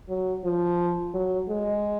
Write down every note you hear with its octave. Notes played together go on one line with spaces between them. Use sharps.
F#3
F3
F#3
G#3